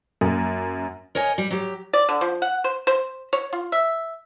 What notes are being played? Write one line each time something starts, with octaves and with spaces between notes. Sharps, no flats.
F#2 A#3
A#4 C#5 D#5 G#5
G3
F#3 G4
D5
D3
F3
F#5
C5
C5
C#5
F4
E5